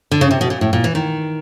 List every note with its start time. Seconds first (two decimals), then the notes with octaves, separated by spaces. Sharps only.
0.11 D3
0.21 C#3
0.31 C3
0.41 B2
0.50 A#2
0.61 A2
0.73 A#2
0.84 E3
0.95 D#3